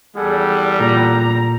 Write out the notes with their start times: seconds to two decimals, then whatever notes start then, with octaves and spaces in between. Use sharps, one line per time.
0.17 E2 G3 G#4 A4 F#5
0.80 A#2 A#5